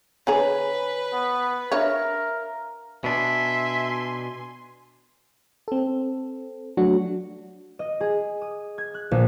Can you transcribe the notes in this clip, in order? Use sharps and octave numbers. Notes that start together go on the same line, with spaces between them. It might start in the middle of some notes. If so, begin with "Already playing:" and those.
D3 G#4 B4 C#5 G#5 A#5
B3
D4 A#4 C#5 E5 F5
B2 D4 E5 G#5 C6
C4 A4
F#3 A3 D4 F#4
D#5
G#4
D#6
G#6
F#6
A#1